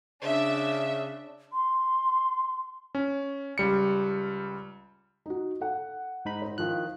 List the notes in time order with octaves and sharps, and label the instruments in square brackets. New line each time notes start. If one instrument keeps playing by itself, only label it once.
[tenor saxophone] C#3 [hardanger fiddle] D4 [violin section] E5
[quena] C6
[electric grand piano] C#4
C#2 G3 C#7
[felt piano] D#4 F#4
A4 F#5
[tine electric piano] G#2 D#4 B5
[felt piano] C5
[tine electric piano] D#3 F3 F#6 [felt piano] E4 F4 F5